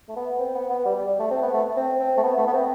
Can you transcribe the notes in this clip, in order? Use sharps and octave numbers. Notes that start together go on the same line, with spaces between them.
A3
B3
C4
B3
B3
G3
G3
G3
A3
C4
B3
A3
C4
C4
A3
B3
A3
B3
C4